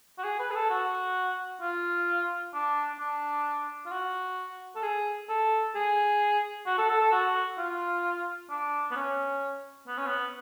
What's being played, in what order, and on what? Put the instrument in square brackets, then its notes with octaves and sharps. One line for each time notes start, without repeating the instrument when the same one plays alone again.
[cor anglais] F#4
G#4
B4
G#4
A4
F#4
F4
D4
D4
F4
F#4
A4
G#4
A4
G#4
F#4
A4
A4
A4
F#4
F4
D4
B3
C#4
B3
C#4
B3